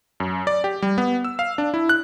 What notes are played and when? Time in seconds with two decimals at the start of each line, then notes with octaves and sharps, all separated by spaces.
0.20 F#2
0.47 D5
0.64 G4
0.82 G3
0.98 B3
1.25 E6
1.39 F5
1.58 D4
1.74 E4
1.89 F#6